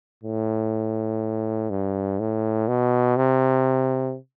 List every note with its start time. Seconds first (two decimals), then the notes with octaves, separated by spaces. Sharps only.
0.23 A2
1.70 G2
2.19 A2
2.68 B2
3.17 C3